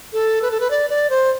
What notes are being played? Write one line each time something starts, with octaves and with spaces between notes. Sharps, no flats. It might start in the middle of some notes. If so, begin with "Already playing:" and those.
A4
B4
A4
B4
D5
D5
C5